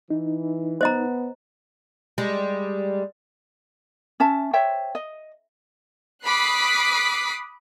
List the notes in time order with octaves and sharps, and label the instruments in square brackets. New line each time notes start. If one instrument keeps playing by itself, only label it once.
[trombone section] E3 [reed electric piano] D#4
[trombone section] B3 [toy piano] C5 D#5 A#5
[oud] G3 G#3
[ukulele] C#4 E5 A5
C5 C#5 E5 G5
D#5
[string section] B5 D6 D#6 F#6 B6 C7